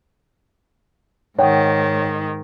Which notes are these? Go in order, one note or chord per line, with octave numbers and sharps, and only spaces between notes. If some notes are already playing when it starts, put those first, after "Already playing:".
G#2 D#3 C#5 F#5 G5